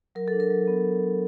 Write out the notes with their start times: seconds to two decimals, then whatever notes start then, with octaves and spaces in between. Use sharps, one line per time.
0.15 F#3 A#4
0.28 A4
0.33 D4
0.40 A#4
0.50 F#3
0.67 B3